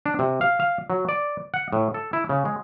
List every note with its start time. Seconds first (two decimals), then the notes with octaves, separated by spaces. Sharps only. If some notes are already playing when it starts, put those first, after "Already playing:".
0.06 D4
0.19 C3
0.41 F5
0.60 F5
0.90 F#3
1.09 D5
1.54 F#5
1.73 A2
1.94 A4
2.13 E4
2.29 C#3
2.45 G#3